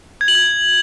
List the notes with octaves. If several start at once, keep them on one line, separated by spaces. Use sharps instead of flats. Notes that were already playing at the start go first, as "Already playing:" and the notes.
G#6
F#7
G#6